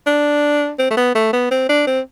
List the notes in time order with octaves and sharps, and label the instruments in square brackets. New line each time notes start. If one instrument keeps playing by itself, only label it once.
[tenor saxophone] D4
C4
A3
B3
A3
B3
C4
D4
C4